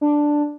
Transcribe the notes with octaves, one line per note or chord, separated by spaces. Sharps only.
D4